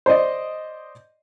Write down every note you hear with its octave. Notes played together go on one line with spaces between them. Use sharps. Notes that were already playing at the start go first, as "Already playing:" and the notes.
C5 D5 D#5